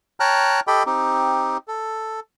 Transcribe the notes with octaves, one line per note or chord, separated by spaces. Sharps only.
C#5 G5 A5 A#5 F6 F#6
G4 A4 D#5 G5 B5
C4 D#4 G4
A4